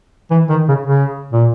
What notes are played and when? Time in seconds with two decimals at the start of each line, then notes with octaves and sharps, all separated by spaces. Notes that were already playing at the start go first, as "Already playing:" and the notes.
0.31 E3
0.49 D#3
0.68 C#3
0.87 C#3
1.32 A#2